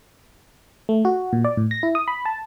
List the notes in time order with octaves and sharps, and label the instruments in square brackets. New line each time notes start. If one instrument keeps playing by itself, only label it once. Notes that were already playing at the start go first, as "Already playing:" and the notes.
[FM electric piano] A3
F#4
A#2
D5
A2
A#6
E4
D#6
B5
A5